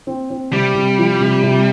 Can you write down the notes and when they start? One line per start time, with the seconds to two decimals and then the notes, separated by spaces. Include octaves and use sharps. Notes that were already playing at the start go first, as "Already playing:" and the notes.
0.07 C4
0.30 C4
0.52 C3 G3
0.75 C3
0.98 F3
1.21 C3
1.43 C3